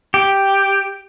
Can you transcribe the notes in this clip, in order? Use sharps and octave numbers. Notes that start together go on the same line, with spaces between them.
G4